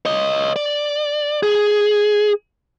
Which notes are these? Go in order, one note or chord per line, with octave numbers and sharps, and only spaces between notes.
C#5 D#5
D5
G#4